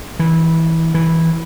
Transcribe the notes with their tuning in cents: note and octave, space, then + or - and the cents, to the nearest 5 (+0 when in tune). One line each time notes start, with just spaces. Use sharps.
E3 -20
E3 -10